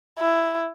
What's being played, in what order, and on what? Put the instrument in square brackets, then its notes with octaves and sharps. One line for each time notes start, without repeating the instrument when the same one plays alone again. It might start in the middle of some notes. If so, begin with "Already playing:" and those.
[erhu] E4